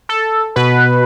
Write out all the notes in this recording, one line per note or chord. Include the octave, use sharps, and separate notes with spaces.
A4
B2 B4